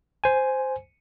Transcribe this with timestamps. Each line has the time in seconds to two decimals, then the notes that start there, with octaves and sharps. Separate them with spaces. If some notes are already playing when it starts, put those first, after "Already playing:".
0.24 C5 G#5